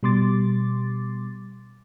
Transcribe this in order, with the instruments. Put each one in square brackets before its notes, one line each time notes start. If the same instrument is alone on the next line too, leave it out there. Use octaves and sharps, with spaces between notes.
[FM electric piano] B2 G3 C6 D6 A6